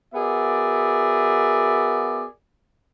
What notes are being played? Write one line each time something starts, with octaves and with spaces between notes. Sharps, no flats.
B3 F#4 G#4 A#4 D5 E5